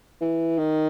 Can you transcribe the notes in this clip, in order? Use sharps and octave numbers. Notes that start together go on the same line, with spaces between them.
E3
D#3